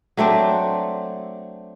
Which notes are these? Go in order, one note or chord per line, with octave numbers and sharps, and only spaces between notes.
F#3 A3 C4 D4